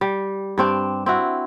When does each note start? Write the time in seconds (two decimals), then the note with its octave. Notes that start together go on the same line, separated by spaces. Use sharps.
0.01 G3
0.58 G2 C4 D4
1.06 C4 E4 F#4